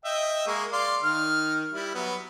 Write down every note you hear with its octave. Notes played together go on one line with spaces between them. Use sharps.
D#5 E5 G5
G#3 A#3 C#6
D5 F5 C6
D#3 F6
G3 E4
F#3 B3 F#4